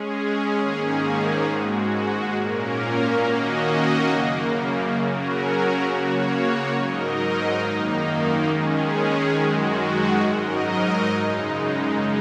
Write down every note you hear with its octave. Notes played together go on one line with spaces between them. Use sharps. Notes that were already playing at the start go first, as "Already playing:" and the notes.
Already playing: G#3 C#4 G#4
G#2 D#3 A#3 C#4 G#4
G#2 G#3 F#4
A#2 A#3 C#4 A#4
D#3 A#3 C#4 F#4 D#5
F#2 C#3 A#3
C#3 F#3 C#4 F#4 A#4
C#3 A#3 F#4 C#5
G#2 F#3 D#4 A#4 D#5
F#2 D#3 A#3 D#4
D#3 G#3 C#4 G#4
F#2 D#3 G#3 F#4
G#2 F#3 D#4 A#4 D#5
F#2 C#3 G#3 D#4